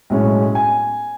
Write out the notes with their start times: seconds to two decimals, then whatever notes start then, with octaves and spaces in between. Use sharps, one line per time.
0.10 B1 A2 G#3 C#4
0.55 G#5